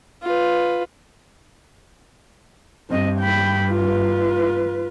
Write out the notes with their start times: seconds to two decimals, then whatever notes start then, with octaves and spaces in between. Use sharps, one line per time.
0.23 F4 B4
2.90 G2 C4 D#5
3.20 G5 B5
3.71 F4 B4